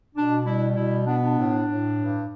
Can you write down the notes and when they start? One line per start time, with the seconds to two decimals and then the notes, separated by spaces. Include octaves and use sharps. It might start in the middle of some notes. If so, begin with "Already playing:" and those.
0.15 B2 D4
0.45 G3 E4
0.76 B2 E4
1.07 B3 D4
1.25 D4
1.37 A2
1.68 A2
1.99 G2